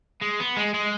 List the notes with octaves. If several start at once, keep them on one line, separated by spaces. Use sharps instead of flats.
G#3
B3
G#3
G#3